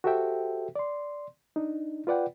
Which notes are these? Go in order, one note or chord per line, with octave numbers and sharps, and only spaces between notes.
F#4 G4 A4 C5 E5 G5
D5 C6
D4 D#4
F4 B4 D5 F#5 G5